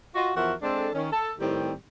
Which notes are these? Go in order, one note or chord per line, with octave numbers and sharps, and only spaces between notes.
F4 F#4 D#5
E2 F3 F#4 A#4 E5 F#5
G#3 C4 D4 A4
D#3 C#4
A4
A2 D#3 G3 C4 G4